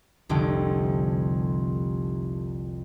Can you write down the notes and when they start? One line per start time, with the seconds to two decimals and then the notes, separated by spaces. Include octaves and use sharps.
0.29 F1 C2 F2 D3 D7